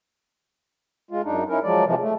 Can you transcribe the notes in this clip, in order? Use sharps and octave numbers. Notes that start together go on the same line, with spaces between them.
G#3 F4
F#2 D4 D#4
C#4 D#4 E4 A#4
F3 F#3 G#3 D5
C3 E3 F3 G#3
A3